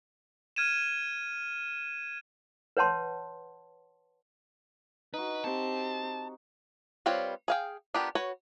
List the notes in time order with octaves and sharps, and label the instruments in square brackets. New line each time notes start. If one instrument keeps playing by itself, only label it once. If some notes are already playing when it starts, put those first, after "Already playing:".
[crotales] F6 G#6 D#7 E7
[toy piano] B4 C#5 F#5 A5 C6
[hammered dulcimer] D#4 F#4 [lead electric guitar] B4
[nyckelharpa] C4 G4 [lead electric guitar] A5
[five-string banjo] G3 C4 F4 B4 C#5
G#4 F5 G5
B3 D4 F4 G4 A#4
F#4 B4 C#5